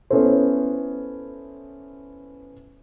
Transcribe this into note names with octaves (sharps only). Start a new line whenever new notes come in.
B3 C#4 E4 A4 C5